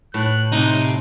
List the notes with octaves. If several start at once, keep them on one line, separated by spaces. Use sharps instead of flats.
A2 F#6
C3 D#4